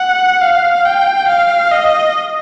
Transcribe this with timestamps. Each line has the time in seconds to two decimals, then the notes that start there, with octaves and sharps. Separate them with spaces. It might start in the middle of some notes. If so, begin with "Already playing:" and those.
Already playing: F#5
0.41 F5
0.85 G5
1.28 F5
1.72 D#5